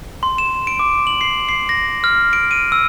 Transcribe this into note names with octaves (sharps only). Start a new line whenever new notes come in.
C6
E7
D7
D6
F#7
C7
C7
A#6
F6
D7
D#7
E6